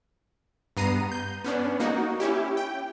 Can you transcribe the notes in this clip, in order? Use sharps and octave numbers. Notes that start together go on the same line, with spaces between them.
G2 B3 A#5 C7 D#7
G6
B3 C#4 D4
A#3 D#4 F#4
C#4 E4 G4
G5